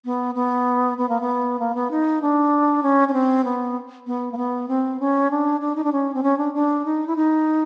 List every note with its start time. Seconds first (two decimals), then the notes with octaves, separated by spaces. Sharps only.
0.05 B3
0.35 B3
0.98 B3
1.09 A#3
1.21 B3
1.59 A#3
1.75 B3
1.91 D#4
2.22 D4
2.83 C#4
3.08 C#4
3.13 C4
3.44 B3
4.07 B3
4.32 A#3
4.37 B3
4.68 C4
5.00 C#4
5.31 D4
5.61 D4
5.75 D#4
5.84 D4
5.92 C#4
6.14 C4
6.23 C#4
6.38 D4
6.54 D4
6.85 D#4
7.07 E4
7.16 D#4